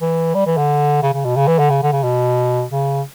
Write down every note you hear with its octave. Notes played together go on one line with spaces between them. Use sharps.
E3
G3
E3
D3
C#3
C#3
B2
C#3
E3
D3
C#3
D3
C#3
B2
C#3